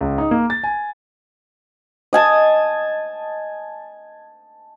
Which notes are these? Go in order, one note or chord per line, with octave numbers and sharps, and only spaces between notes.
C#2
D#4
A#3
A6
G#5
D#5 G#5 A5